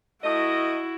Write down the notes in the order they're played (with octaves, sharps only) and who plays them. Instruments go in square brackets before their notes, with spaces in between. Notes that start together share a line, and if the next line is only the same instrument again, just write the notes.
[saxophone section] A3 D#5 [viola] E4 F#4